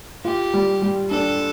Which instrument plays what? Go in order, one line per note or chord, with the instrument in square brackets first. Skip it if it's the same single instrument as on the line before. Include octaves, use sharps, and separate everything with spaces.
[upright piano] F4 [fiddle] G4
[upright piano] G3
G3
[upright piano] D4 [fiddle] A4